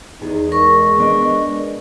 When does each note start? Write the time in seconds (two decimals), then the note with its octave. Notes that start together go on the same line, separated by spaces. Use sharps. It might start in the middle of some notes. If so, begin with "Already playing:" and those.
0.22 E2 B3 D#4 G#4
0.52 G#3 A#4 C#6
0.98 B3 D4 D#5